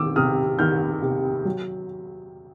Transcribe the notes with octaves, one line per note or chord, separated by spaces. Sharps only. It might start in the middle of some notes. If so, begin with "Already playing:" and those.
Already playing: D#3 D6 E6
C3 D#6 F6
D#3 F6 G6
C3
F#3